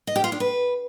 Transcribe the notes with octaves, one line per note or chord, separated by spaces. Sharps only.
D#5
G4
F4
D4
B4